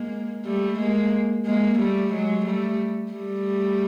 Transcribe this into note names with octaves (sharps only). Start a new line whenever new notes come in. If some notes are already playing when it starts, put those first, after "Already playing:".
Already playing: G#3 A#3
G3 A3
G#3 A#3
G#3 A#3
G3 A3
F#3 G#3
G3 A3
G3 A3